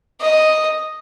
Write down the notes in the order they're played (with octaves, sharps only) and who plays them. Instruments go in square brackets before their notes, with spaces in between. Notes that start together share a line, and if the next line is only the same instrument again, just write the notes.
[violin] D#5